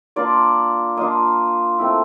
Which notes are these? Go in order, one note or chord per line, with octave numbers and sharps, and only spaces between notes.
A#3 D4 F4 D5
A#3 D4 F4 D#5
A3 C4 E4